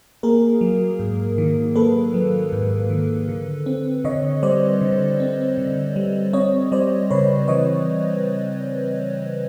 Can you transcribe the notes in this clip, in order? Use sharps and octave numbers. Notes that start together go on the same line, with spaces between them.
A#3 G#4 A#4
F#3
G#2
D#3
A#3 A4 B4
F#3
G#2
D#3
D3
C4
D3 C#5 D#5
G3 C5 D5
D3
C4
D3
G3
C4 C#5 D#5
G3 C5 D5
C#3 B4 C#5
E3 C#5 D#5